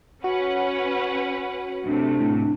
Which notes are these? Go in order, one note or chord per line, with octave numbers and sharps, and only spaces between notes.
C#4 F#4 B4 F#5
C3 A3 D4
A2